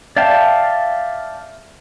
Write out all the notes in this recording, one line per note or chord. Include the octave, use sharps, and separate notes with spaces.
D5 E5 F5 G5 A5